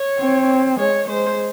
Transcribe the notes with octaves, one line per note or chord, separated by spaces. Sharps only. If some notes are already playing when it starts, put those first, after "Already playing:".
Already playing: C#5
C4
G#3 C#5
G#3 C5